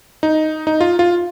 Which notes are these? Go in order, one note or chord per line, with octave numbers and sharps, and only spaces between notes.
D#4
D#4
F4
F4